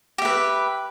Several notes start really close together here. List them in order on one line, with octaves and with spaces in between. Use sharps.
G4 E5 B4